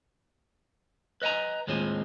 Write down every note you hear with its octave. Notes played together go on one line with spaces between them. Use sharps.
B4 D#5 F#5 G#5 A#5
D#2 A2 G#3 C4 F4 G#5